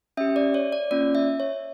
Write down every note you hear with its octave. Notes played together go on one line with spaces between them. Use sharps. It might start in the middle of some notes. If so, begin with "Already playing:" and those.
C#4 G4 E5
D5
C#5
D5
A#3 C#4 F4 D5
E5
C#5